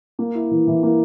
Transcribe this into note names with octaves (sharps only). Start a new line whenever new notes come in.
A#3
E4
E3
E3
A#3